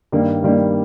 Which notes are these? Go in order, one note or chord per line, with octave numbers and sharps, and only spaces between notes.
G2 D#3 G3 A#3
G2 D#3 G3 A#3